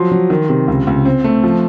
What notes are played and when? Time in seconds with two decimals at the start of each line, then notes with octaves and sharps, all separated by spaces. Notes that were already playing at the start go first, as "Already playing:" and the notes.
Already playing: F3 F#3 C6
0.11 F#3
0.30 D#3
0.49 C3
0.68 C#2
0.87 C#2
1.05 C4
1.24 A3
1.44 F3